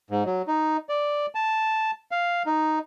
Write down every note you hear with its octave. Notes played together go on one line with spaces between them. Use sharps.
G#2
F#3
D#4
D5
A5
F5
D#4